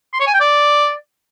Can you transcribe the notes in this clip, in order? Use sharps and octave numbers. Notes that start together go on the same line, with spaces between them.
C6
C#5
G#5
G5
D5